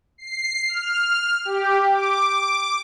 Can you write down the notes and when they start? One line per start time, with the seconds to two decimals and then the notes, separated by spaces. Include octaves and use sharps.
0.18 C7
0.69 F6
1.45 G4
1.92 D6